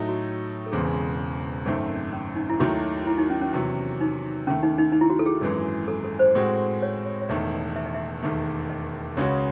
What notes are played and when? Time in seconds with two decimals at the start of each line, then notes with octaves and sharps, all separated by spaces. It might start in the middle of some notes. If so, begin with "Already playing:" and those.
Already playing: A2 F#3 A3 D#4
0.09 F#4
0.67 A4
0.71 E1 E2 C#3 G#3 C4 G#4
1.66 G#1 F#2 D#3 A3 C4 C#4
2.13 C#4
2.36 D#4
2.50 E4
2.60 D#2 D#3 F#3 A3 F#4
3.01 F#4
3.07 E4
3.18 D#4
3.30 C#4
3.41 C#4
3.53 E2 C3 F#3 C#4
4.01 D#4
4.47 D#2 D#3 A3 C#4
4.63 D#4
4.78 D#4
4.92 D#4
5.01 E4
5.10 F#4
5.19 A4
5.26 G#4
5.41 G#1 F#2 E3 G#3
5.88 A4
6.04 A4
6.19 C5
6.35 A2 G#3 C4 F#4
6.82 C#5
7.06 C#5
7.21 C#5
7.29 E1 E2 D#3 A3 D#5
7.76 E5
7.86 D#5
7.94 E5
8.23 E1 D#2 D#3 A3
8.70 D#5
9.17 C#2 C#3 G#3 C#4 F#4 C#5